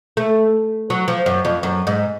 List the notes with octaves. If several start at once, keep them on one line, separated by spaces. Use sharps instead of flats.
A3
F#3
F3
F#2
F2
F#2
G#2